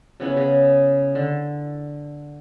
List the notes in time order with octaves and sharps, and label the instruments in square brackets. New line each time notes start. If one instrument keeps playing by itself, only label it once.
[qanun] C#3 B3 C#4 E4
C#3
D3